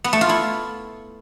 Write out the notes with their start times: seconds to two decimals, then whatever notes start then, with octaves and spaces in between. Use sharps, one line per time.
0.04 B3
0.13 A3
0.21 F4
0.29 E4